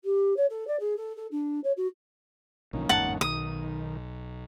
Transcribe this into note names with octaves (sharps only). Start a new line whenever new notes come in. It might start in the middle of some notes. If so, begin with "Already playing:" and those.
G4
C#5
A4
D5
G#4
A4
A4
D4
C#5
F#4
B1 D3 F3 A#3 C#4 D#4
G1 E2 G#2 F#5 A5
B1 D#3 D#6